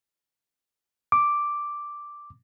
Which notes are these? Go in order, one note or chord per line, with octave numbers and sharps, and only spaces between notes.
D6